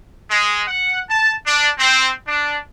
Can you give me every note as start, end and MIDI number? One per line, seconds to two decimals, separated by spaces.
0.29 0.61 56
0.67 0.98 78
1.09 1.33 81
1.46 1.68 62
1.78 2.10 60
2.27 2.57 62